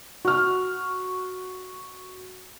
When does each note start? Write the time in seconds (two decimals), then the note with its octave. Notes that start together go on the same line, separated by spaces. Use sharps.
0.25 F#4 F6